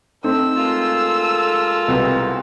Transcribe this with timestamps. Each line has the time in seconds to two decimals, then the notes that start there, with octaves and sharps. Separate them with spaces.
0.24 A3 C4 D#4 A4 E6
0.57 G#3 A#3 F4
1.88 C2 B2